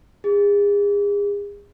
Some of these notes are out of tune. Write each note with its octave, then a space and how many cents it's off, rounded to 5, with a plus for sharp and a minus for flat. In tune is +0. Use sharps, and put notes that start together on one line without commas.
G#4 -35